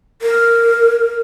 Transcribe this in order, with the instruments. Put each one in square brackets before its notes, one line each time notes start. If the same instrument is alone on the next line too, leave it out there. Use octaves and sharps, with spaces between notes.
[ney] A#4